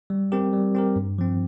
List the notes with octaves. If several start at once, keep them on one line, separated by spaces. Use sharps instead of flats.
G3
C4 G4 A#4
G3
C4 G4 A#4
G2
F3 C4